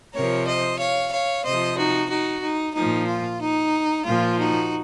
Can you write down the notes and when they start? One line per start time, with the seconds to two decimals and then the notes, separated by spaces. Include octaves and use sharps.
0.15 C3 F3 A#4 C#5
0.48 C5 D#5
0.79 C#5 F5
1.12 C#5 F5
1.45 C3 F3 C5 D#5
1.77 D#4 F#4
2.10 D#4 F#4
2.44 D#4
2.75 F3 D#4
2.81 A#2
3.08 F4
3.41 D#4
4.06 A#2 F3 F4
4.38 D#4 F#4